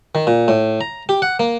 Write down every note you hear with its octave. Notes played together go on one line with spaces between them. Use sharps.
D#3
A#2
A2
A#5
G4
F#5
A#3